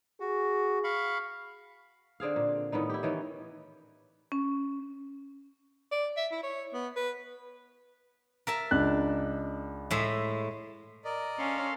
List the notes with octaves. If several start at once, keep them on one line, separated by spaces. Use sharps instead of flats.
F#4 G#4
F5 B5 C#6
D3 C4 G#4 F5
A#2
A2 D#3 B3 D#4
E4 G4
D#3 E3 C#4
C#4
D5
E5
E4
C#5
B3
B4
A#4 E5 A5
C#2 D4 F#6
A2 G#3 E5
A#4 D5 D#5
C#4 A4 F5 C6